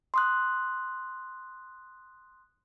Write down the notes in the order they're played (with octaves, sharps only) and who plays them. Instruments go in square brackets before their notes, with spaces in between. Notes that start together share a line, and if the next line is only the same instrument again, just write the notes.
[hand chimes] C6 D#6 F#6